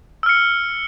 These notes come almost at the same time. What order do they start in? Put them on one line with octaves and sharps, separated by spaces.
E6 F6 C#7